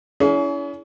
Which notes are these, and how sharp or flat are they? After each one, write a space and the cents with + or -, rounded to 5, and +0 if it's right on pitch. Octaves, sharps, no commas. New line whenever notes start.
C#4 +40 E4 +0 G#4 +25